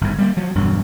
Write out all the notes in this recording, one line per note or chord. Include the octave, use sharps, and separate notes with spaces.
G1 G#2
G3 G#3 A#3
F3 F#3
E1 D2 G2 F#3